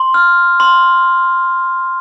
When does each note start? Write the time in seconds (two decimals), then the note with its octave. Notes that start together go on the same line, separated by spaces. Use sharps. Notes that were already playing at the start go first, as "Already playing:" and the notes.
Already playing: C6
0.14 F6
0.60 C6